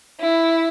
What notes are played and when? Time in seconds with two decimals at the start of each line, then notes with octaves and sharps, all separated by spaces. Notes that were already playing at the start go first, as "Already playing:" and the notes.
0.20 E4